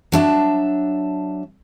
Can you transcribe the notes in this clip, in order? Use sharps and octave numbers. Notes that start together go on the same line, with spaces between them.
F#3 D4 E5 A5